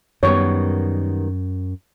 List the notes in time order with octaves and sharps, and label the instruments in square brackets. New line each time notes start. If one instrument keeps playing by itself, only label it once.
[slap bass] F#2 [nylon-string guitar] D#3 G3 B3 [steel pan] C#5